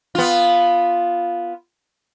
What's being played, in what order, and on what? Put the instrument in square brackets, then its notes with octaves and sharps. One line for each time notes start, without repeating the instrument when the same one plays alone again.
[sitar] B3 F4